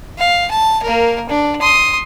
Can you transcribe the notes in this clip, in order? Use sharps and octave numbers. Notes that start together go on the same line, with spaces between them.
F5
A5
A#3 A#4
D4
C6 D#6